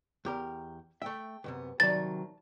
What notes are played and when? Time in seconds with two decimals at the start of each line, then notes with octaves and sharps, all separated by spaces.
0.25 E2 G4 A#4
1.02 A3 E5 G5
1.44 B1 F#2 C3 B3
1.80 C3 D#3 F#3 D5 A5 A6